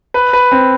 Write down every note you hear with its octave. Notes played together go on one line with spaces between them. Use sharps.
B4
B4
C4